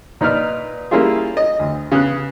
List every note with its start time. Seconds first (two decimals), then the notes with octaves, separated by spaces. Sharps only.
0.21 A#2 D#4 B4 D5 F6
0.91 G3 A#3 C#4 E4 F4 G#4
1.37 D#5
1.59 D2
1.92 C#3 B3 F#6